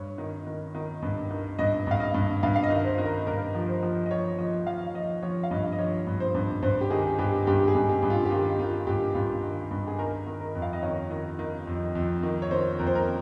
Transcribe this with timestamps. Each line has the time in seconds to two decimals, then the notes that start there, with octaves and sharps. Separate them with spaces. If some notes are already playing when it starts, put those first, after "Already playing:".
Already playing: G2 C#5
0.18 D#3
0.47 D#3
0.75 D#3
1.02 G2
1.31 D#3
1.59 G2 D#5
1.87 G2 F5
2.00 D#5
2.14 G2
2.43 G2 F5
2.56 F5
2.63 D#5
2.70 D#3
2.84 C5
2.98 D#3
3.06 A#4
3.27 G2 A#4
3.55 F3
3.69 C5
3.83 F3
4.06 D#5
4.11 F3 C#5
4.38 F3 D#5
4.66 F3 F5
4.94 F3 D#5
5.23 F3 C#5
5.43 F5
5.51 G2 D#5
5.72 D#5
5.79 F3 C#5
6.07 G2
6.20 C5
6.34 G2
6.62 G2 C5
6.81 G4
6.90 D#3 G#4
7.19 G2 G4
7.47 G2 G4
7.68 G#4
7.75 G2
7.89 G4
8.03 G2
8.10 F4
8.25 G4
8.30 D#3 F4
8.59 D#3 F4
8.87 G2 G4
9.15 G2 F4
9.43 D#3
9.71 G2
9.87 G#4
9.99 D#3 A#4
10.27 D#3
10.41 A#4
10.55 F2
10.62 F5
10.73 D#5
10.82 D#3 C#5
11.11 D#3
11.39 D#3
11.67 F2
11.95 F2
12.23 D#3
12.42 C#5
12.51 D#3 C5
12.79 F2 A#4
12.87 C5
12.95 A#4